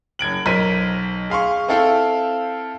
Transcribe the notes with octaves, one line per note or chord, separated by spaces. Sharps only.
F#1 G#6 D7 F#7
B1 A#4 C5 B6 D#7
G#4 F5 C6 C#6
C4 E4 A4 F5 G5